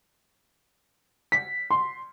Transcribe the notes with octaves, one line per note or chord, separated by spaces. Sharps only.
B6
C6